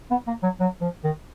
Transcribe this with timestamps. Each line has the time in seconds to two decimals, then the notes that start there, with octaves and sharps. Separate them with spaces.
0.11 B3
0.27 A#3
0.43 F#3
0.60 F#3
0.81 F3
1.04 D#3